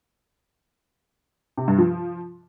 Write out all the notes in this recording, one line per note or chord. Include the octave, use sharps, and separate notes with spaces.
C3
G2
F3